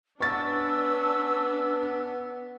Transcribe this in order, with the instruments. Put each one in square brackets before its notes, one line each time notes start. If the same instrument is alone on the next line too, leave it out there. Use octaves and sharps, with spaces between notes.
[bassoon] B3 [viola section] C#4 D4 B4 [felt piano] C#6 A6 [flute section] E6